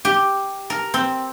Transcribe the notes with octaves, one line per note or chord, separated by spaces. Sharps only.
G4
A#4
C4